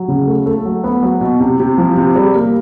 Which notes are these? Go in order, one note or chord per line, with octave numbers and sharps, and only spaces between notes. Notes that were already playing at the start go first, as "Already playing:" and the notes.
Already playing: F#3
C#3
A3
A3
F#3
B3
F#3
B2
C3
C3
F3
C3
G3
A#3